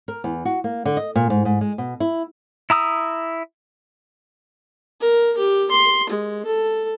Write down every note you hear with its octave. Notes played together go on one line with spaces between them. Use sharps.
A#4
E2
F#4
A#3
D3
D#5
A#2
G#2
G#2
G#3
B2
E4
E4 A#5 D#6 E6
A#4
G4
C6
G#3
A4